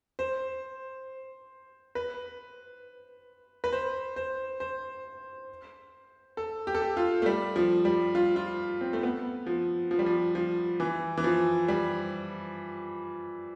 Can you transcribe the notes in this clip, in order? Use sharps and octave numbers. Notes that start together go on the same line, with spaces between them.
C5
B4
B4
C5
C5
C5
A4
G4
A4
G4
F4
A3
G3
F3
G3
F4
F4
C4
A3
B3
F3
F3
G3
F3
F3
E3
E3
F3
G3